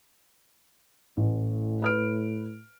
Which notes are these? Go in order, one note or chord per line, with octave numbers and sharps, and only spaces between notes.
A1 A2
B4 F6 D7